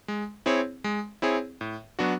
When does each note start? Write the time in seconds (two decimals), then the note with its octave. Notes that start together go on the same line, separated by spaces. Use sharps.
0.08 G#3
0.46 C4 E4 G#4 C#5
0.84 G#3
1.22 C4 E4 G#4 C#5
1.61 A2
1.99 F#3 B3 D4 F#4